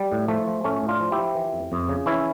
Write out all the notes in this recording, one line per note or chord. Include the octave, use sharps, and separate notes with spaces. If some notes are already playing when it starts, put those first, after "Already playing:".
Already playing: G3
A2
F3 A3
F3
A2 A3 C#4
A2
D4 F4
F3
E4 G4
F3
E3
F2
F2
C#3
E3 C#4 E4